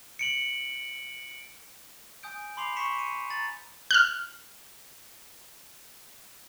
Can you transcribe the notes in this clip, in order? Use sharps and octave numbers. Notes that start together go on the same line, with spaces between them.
C#7 D7 F#7
G#5 D#6 G6 D7
B5 C6 D6 C7 F7
C6 C#6 B6 C#7 E7
C#7 D#7
A#5 A6 F#7
F6 F#6